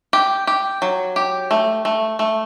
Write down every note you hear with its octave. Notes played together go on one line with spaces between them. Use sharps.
G4
G4
F#3
G4
A3
A3
A3